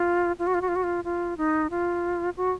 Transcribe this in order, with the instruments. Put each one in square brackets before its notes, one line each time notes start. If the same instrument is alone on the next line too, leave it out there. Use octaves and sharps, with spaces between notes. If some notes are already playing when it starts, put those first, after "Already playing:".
Already playing: [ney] F4
F4
F#4
F4
F#4
F4
F#4
F4
F4
D#4
F4
F#4